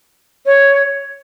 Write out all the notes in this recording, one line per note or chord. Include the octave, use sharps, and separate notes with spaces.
C#5